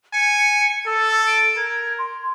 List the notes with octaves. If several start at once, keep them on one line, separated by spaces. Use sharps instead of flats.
G#5 C#7
A4 E6
D7
A#4 G#6
C6